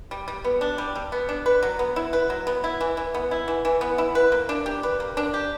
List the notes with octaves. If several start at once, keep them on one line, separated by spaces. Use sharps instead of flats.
G3
G3
B3
D4
G3
G3
B3
D4
B4
F#3
B3
E4
B4
F#3
B3
E4
E3
E3
B3
E4
E3
E3
B3
E4
B4
A#3
D4
G4
B4
A#3
D4
G4